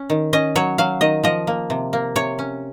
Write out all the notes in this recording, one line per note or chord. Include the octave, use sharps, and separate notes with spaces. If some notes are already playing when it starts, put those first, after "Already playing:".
Already playing: C#4
D#3
C#4 D#5
F#3 C#5
F#3 F5
D#3 D#5
F3 D#5
A#3
C3
A#3
C3 C#5
C#4